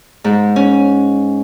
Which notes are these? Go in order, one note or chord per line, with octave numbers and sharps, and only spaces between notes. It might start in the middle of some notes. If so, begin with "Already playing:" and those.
G#2
C#4